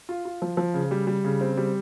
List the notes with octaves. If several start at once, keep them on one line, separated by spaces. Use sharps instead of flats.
F4
F4
F3
F3
C#3
G3
G3
C#3
C4
G3